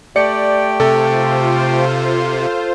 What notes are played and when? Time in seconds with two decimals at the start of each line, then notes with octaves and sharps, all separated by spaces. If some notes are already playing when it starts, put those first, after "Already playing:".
0.16 A3 G4 D5 G5 C#7
0.80 C3 F4 A4 C5